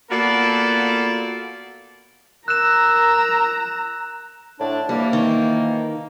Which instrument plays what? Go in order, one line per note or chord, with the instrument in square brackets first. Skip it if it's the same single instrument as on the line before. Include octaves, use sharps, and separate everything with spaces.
[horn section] A#3 B3 F4 F#4 A4 D5
[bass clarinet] A#4 [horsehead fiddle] A#5 [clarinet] E6 [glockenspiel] F#6 E7
[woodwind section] A2 D3 D4
[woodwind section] E3 F3 A#3 [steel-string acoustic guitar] G3
[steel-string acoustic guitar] D#3